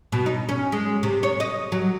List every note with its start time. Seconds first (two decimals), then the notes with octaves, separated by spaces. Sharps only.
0.12 B2
0.26 D#4
0.49 C#4
0.72 G#3
1.03 C3
1.23 C#5
1.40 D#5
1.72 F#3